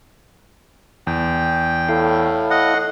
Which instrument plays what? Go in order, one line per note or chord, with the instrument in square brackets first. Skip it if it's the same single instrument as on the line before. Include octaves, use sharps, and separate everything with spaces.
[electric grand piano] E2 [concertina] G5
[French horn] A2 [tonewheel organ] E4 A4 F5
[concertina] D#5 F#5